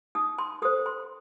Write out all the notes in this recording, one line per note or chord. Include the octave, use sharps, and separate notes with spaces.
D#4 D#6
C6
A4 C5 D#6
C6